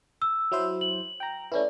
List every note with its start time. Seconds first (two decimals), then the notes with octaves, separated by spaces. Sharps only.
0.22 E6
0.52 F#3 E4 C5
0.81 F#7
1.20 G5 A#5
1.52 A3 C#4 E4 B4 D5